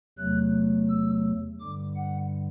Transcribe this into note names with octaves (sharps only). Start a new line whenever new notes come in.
E2 C3 F#3 A3 F#6
E6
G2 D3 G3 D6
F#5